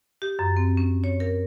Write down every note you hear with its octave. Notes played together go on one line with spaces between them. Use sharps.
G4
F#2
C4
C#4
C#5
A#4